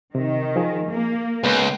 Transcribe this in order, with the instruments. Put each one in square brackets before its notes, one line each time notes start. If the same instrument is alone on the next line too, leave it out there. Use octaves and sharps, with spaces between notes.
[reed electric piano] C3 [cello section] D#3
[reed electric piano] F3 D#4 G#4
[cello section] A#3
[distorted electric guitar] C#2 [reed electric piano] B3 B4